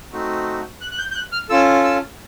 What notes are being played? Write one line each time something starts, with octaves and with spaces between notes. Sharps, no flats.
A3 C4 D#4 F#4
F#6
F#6
G6
G6
F#6
F6
C#4 F4 A4 E6
E6